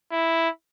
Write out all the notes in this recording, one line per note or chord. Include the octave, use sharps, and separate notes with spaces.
E4